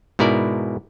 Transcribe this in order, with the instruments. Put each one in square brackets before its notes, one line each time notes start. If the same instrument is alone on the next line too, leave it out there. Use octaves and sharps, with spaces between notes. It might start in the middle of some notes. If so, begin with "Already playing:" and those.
[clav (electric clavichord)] G#2 B2 E4 A#4 D5